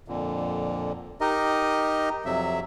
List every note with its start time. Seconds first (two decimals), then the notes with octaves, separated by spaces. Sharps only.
0.08 F2 A#2 D3
1.21 D#4 G4 A#4 D#5
2.25 F2 C3 F#3 E5